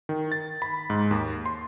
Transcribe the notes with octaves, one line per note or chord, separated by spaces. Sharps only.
D#3
A6
B5
G#2
D#2
C6